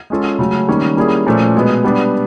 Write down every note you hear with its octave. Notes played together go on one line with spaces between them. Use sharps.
G#3 C#4 F4 A4
C#3 F#3 A3
D#3 G3 A#3 C#4
G3 A#3 C#4 E4 G#4
A#2 F3 A3 C#4
B2 G#3 B3
G3 B3 D4